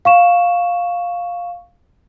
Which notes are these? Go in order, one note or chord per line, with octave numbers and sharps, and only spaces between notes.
F5 C#6 E7